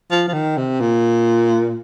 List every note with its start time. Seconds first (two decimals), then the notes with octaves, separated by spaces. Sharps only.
0.11 F3
0.27 F3
0.34 D#3
0.57 C3
0.80 A#2